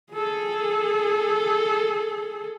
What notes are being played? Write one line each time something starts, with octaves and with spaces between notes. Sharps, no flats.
G#4 A4